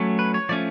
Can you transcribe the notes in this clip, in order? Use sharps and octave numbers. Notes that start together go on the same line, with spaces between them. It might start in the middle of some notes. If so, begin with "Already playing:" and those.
Already playing: F#3 A3 C#4
B4
C#5
F3 A3 C#4 D5